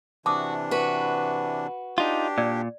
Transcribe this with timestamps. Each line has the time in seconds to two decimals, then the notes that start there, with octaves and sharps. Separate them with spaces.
0.26 C3 E3 D4 F#4 A5 D6 D#6
0.71 F#4 B4
1.98 D4 D#4 F4 G4
2.38 A#2 D5